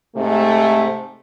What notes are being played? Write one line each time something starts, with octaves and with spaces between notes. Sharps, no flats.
G#2 C3 A3